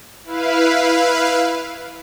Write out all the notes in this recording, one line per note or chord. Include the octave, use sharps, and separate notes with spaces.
E4 B4 F5